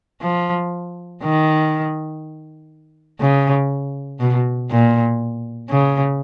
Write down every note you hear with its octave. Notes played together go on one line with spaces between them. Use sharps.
F3
D#3
C#3
B2
A#2
C#3